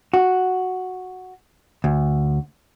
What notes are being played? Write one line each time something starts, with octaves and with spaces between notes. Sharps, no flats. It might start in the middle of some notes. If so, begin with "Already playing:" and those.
F#4
D2